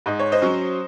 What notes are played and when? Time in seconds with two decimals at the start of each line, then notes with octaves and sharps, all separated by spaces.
0.06 G#2 D#5
0.19 C#5
0.32 C5 D#5
0.42 F#3 C#4